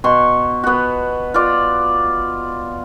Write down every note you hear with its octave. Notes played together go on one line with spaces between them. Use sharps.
B2 C6 C#6
B3 F#4
F4 D5